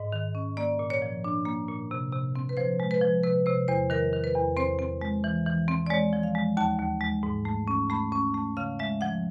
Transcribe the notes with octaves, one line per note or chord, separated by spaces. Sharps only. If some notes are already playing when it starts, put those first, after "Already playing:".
Already playing: G#2 D#5
D#3
C#4
A#3 D5
A#2
C#5
F3
D4
A#3
A#2
C3
C3
C4
B4
F3 C5
G#3
B4
F3
C3 B4
C3 C5
E2 C5
D#3 A#4
D#3
B4
E2
C4 C5
C4
G#3
E3
E3
C4
D5
G#3 C#5
F3
F5
G#3
D#2 A5
D#2
G#3
G#2
A3
C#4
A3 B5
C#4
A3
C#3 F5
G#3 E5
F3 F#5